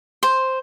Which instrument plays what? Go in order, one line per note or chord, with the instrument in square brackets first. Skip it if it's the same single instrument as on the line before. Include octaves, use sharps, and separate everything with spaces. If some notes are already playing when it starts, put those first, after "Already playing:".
[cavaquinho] C5